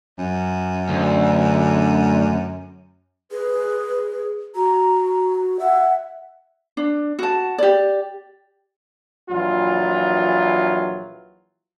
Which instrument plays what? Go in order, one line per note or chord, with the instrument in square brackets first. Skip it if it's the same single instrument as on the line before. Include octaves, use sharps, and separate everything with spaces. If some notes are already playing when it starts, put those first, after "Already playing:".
[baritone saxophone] F#2
[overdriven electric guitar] D2
[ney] G#4 [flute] B4
[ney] F#4 [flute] A#5
[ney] E5 [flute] F#5
[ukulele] D4
F#4 A5
G4 D5
[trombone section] A#1 E3 F#3 F4